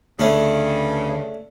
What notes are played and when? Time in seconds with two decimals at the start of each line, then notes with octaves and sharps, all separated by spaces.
0.19 D2 G2 C#3 A3 C#4 D4